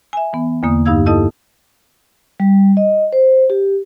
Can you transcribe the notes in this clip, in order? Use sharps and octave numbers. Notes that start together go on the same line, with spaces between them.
E5 G#5
E3 B3
E2 D3 A#3 D#6
G2 D#4 G4 F5 E6 G#6
E4 G4 A4 D#5 A5 D#6
G3
D#5
C5
G4